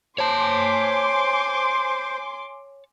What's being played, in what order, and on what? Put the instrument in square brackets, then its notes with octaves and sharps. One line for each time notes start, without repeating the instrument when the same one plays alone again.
[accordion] C5 [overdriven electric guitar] C#5 A5 [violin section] G#5 C6 D6